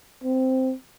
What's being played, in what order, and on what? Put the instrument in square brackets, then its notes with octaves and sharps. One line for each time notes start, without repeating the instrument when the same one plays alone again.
[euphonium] C4